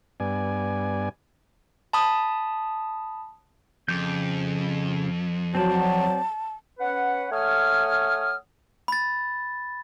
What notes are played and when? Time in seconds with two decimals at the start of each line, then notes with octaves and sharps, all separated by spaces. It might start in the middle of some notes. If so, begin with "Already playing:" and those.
0.20 G2 B3 D5 G#5
1.93 A5 B5 D#6
3.88 F2 C#3 D6 G6
5.55 F#3 C4 C5 D5 A5
6.79 C#4 B4 F#5
7.32 A3 C#5 F#5 G#5 D#6 F6
8.88 B5 A6